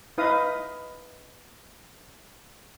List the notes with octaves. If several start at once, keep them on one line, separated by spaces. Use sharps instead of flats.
D#4 E4 B4 D#5 F5 D#6